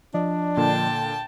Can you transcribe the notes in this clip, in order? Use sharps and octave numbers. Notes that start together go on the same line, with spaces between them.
F3 D4 D5 D#5
A#2 D3 G5 A5